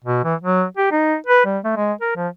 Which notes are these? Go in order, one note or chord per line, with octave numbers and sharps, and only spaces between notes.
B2
E3
F#3
G4
D#4
B4
G3
A3
G#3
A#4
F3